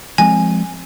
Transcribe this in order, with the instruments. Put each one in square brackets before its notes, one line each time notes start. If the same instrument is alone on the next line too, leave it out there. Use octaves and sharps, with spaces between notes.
[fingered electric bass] F3 G#3 C4 [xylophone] G#5